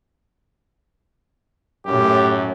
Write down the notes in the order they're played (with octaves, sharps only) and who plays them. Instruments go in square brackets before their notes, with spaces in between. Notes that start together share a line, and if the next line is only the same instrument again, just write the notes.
[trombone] F#2 [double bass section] A2 [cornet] G4